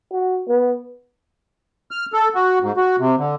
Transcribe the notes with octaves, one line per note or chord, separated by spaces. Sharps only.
F#4
B3
F6
A4
F#4
G#2
F#4
C3
D3